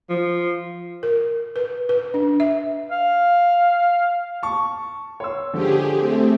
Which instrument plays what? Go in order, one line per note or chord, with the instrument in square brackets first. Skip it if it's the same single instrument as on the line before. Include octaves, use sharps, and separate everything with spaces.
[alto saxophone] F3
[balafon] A#4
B4
B4
D4
E5
[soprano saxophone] F5
[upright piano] A5 C#6
C#5 C6 E6
[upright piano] D3 F3 [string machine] G4 G#4
[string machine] A3 C4